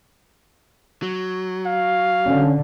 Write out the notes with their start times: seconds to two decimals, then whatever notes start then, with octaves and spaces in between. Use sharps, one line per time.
1.02 F#3
1.66 F5
2.26 D3 C#4